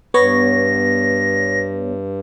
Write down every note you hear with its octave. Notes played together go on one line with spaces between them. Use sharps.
G2 B3 C#5 A#6